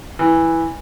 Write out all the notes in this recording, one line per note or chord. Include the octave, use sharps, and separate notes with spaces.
E3